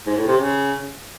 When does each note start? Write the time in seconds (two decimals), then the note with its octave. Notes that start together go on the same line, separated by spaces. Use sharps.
0.06 G#2
0.16 A2
0.27 C3
0.37 C#3